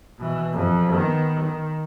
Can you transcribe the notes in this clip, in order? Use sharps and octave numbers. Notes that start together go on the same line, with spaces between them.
B2 E3
F2
D#3 B3
D#3